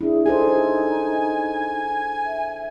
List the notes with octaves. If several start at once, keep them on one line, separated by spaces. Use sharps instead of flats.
D4 E4 G#4
D#4 G#4 A4 C5 G#5
E5